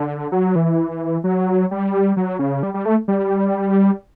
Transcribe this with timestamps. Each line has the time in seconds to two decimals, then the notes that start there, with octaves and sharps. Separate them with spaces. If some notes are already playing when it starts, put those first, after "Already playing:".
Already playing: D3
0.32 F#3
0.56 E3
1.24 F#3
1.71 G3
2.17 F#3
2.39 C#3
2.63 G3
2.74 G3
2.85 A3
3.08 G3